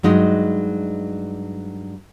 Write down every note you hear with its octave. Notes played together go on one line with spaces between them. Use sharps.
G2 F#3 G#3 D#4